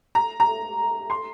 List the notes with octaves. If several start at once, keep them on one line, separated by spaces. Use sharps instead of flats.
A#5
A#5
C6